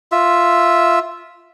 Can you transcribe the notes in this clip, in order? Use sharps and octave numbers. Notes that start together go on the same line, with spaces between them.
F4 E5